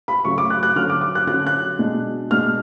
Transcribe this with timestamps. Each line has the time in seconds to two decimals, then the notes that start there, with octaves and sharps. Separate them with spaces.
0.08 B5
0.25 C#3 F#3 A3 C#6
0.38 D6
0.50 F#6
0.63 F#6
0.76 D3 F#3 C#4 F6
0.90 D6
1.01 D6
1.15 F#6
1.27 D3 F#3 C#4 F#6
1.47 F#6
1.79 B2 G#3 D4
2.31 B2 G#3 D4 F6